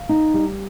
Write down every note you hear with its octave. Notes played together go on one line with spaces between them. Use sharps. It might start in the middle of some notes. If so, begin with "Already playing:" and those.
Already playing: F5
D#4
G3